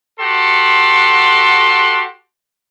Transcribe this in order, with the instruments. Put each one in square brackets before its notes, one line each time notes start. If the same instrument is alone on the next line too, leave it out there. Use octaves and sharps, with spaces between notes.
[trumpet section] F#4 G4 A4 F#5 C6